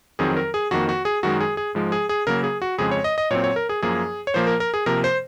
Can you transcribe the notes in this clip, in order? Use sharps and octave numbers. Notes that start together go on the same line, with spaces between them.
F2 D#3 F#3 C4 G#4
A#4
G#4
F2 D#3 A#3 F#4
F#4
G#4
F#2 D#3 G#3 F#4
G#4
G#4
G#2 F3 G#3
G#4
G#4
C#3 F#3 A#3 A#4
G#4
F#4
F2 C#3 G#3 C4 G#4
C#5
D#5
D#5
A#2 F#3 C4 C#5
C#5
A#4
G#4
F#2 F3 A#3 G#4
C#5
A#2 F3 A#3 C5
A#4
A#4
G#4
C3 F3 A#3 A#4
C5